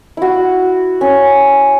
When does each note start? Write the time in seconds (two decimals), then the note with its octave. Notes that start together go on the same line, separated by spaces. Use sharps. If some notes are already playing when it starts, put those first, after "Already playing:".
0.17 E4 F#4
1.01 C#4